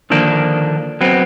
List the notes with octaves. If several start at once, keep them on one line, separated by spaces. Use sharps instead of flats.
D3 D#3 F3 A#3 D4
F#3 B3 C4